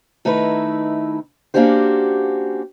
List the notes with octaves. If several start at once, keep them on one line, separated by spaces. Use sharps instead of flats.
D#3 A3 D#4 E4 B4
A#3 C#4 D4 F#4 G4 C5